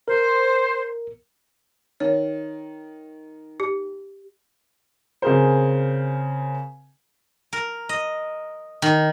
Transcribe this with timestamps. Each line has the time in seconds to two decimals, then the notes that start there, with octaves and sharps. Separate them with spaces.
0.08 A#4 C5
2.00 D#3 C#5
3.60 G4
5.22 C#3 C4 G#4 A#4 C5
7.53 A#4
7.89 D#5
8.82 D#3